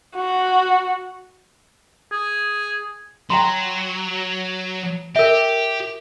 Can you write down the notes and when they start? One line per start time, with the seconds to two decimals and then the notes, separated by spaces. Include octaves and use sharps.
0.16 F#4
2.12 G#4
3.30 F#3 G5 A#5 C6
5.16 G4 A#4 E5